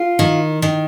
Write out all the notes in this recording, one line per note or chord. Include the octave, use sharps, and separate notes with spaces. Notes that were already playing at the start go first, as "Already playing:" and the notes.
Already playing: F4
D#3
D#3